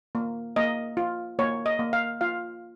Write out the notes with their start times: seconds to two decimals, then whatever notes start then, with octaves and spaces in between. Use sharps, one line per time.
0.15 A#3
0.56 A#3 D#5
0.97 F4
1.39 A#3 C#5
1.66 D#5
1.79 A#3
1.93 F5
2.21 F4 F5